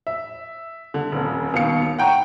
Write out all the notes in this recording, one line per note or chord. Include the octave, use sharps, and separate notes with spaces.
E5
D3
D#1 F2
D#2 B2 F5 C#7
F#5 G5 A#5 C#6